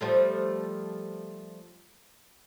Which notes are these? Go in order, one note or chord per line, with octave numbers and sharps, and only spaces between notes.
F3 G3 A3